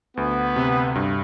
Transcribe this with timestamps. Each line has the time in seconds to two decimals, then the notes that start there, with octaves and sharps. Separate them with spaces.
0.17 D2 B3
0.56 C3
0.95 G2